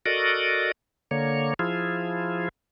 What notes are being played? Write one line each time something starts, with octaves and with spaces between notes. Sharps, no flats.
F#4 A4 A#4 D5 D#5
D3 A#3 C#5
F3 E4 F4 G#4